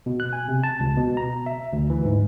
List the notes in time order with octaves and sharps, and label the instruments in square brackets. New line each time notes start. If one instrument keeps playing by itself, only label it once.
[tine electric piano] B2
F#6
G#5
C3
A5
C#2
B2
A#5
E5
D2
E3
G#2